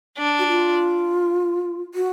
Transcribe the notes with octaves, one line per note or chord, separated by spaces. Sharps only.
D4
F#4
F4
F#4